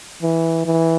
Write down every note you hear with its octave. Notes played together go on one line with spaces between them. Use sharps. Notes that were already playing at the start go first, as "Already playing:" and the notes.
E3
E3